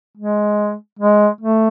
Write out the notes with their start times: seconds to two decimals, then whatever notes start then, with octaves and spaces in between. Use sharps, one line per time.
0.17 G#3
0.99 G#3
1.41 A3